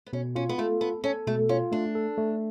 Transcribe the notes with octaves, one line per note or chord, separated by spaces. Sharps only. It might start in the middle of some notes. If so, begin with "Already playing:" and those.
B3
B2 C#4
C#4 F4
B3
A3 F4
B3 A4
C#4 A4
B2 A3
C#4 F4
A3 D4
A4
A3